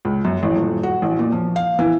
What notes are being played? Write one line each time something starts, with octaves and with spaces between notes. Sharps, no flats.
C#2
F#2
A1
D#1
F#4
A1
A#2
F3
F5
E3